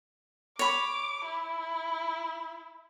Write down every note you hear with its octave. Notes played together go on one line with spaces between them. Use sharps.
C#5 B5 D6
E4